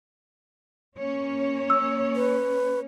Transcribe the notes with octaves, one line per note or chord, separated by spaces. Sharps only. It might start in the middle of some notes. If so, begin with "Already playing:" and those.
A#3 C#4 C#5
E6
B4